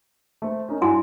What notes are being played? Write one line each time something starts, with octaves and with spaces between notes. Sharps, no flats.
A3 C4
C#4 D#4 A#4
G2 E4 F#4 G#5